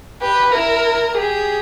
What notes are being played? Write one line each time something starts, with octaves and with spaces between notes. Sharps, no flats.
G4 B4
E4 A#4
G4 G#4